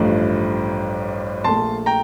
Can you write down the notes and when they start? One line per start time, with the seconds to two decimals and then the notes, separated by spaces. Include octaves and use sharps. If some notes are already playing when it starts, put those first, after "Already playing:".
Already playing: A1 G2 F3 A3
1.44 A#1 A#2 A3 A5 C6
1.86 G5 A#5